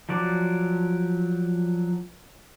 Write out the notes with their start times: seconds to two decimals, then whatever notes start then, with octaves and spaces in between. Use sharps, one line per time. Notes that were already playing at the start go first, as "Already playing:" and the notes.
0.09 F3 F#3 D5